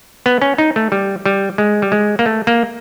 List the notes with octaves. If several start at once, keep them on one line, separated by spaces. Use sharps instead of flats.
B3
C#4
D#4
A3
G3
G3
G#3
G3
G#3
A#3
A3
A#3